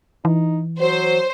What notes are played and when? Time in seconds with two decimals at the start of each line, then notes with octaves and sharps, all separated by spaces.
0.25 E3 D#4
0.80 F#3 C5